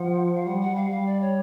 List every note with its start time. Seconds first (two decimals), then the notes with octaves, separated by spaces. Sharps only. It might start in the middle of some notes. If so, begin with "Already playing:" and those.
Already playing: F3 F#5
0.35 F5
0.46 G3 F#5
0.61 F#5
0.69 G3
0.76 F5
0.91 G3 F5
1.06 D5
1.21 C#5